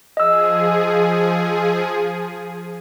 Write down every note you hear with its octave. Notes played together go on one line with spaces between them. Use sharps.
F3 G#4 D#5 E6